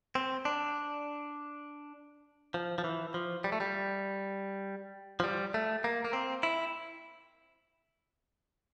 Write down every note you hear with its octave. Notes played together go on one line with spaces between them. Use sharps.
C4
D4
F3
F3
E3
F3
G3
A3
G3
F3
G3
A3
A#3
A#3
C4
E4